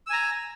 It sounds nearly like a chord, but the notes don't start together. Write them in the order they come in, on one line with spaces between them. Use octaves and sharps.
E6 G#5 A#5